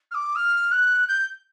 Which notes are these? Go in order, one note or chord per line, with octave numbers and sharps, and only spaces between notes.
F6
D6
F6
F#6
G6